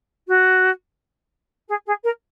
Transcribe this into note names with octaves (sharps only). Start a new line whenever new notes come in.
F#4
G#4
G#4
A#4